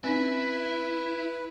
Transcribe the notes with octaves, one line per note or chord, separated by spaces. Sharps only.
C4 C#4 D#4 E4 B4